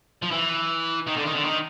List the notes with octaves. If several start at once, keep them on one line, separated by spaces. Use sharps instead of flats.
F3
E3
D#3
D3
D#3
D3
D#3